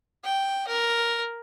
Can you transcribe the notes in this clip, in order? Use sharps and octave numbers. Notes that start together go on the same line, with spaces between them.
G5
A#4